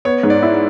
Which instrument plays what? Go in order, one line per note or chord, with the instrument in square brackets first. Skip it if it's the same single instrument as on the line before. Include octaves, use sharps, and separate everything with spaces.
[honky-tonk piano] B3 [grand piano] C#5
[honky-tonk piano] G#2
[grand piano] D5
[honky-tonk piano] E4